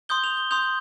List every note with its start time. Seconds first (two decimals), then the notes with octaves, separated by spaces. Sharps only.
0.09 C6 D#6 G6 G7
0.24 F7
0.37 G7
0.51 C6 D#6 G6 F7